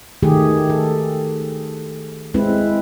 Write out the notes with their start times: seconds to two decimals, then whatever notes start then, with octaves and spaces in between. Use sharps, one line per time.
0.23 D#3 A3 G4 G#4
0.70 A4
2.34 G#3 C4 E4 B4